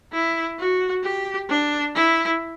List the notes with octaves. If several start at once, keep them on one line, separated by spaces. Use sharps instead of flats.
E4
F#4
G4
D4
E4